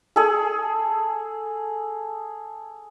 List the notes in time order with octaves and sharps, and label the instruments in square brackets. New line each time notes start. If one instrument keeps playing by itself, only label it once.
[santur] G#4 A4